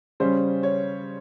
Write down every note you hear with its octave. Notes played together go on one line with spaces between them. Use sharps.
C#3 G3 C#4 C5
C#5